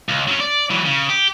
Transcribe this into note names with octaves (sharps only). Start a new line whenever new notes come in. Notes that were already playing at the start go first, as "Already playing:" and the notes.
C#2
F#3 C#4
D5
E3 F#3
C#3
G4